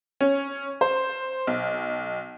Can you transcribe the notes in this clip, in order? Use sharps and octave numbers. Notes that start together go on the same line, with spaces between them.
C#4
C5
B1